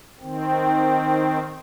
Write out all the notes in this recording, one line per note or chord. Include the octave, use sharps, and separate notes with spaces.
D#3 C4